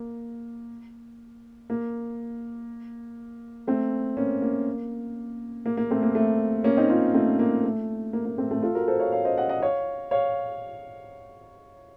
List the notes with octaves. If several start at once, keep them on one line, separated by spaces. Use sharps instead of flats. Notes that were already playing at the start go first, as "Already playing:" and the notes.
Already playing: A#3
A#3
A3 C4
A#3 C#4
A#3
A#3
A#3
A3 C4
A#3
A3
A#3 C#4
C4 D#4
C#4 F4
A3 C4
A#3
A3
A#3
A#3
A3 C4
A3 C4
F4 A4
F#4 A#4
A4 C5
C#5 F5
C#5 F5
C5 D#5
D#5 F#5
D#5 F#5
C#5 F5
C#5 F5